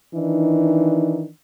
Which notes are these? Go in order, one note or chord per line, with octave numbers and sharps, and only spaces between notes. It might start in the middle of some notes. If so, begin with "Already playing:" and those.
D#3 E3 D4 D#4